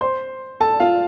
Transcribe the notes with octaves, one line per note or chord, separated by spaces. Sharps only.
C5 C6
A4 A5
F4 F5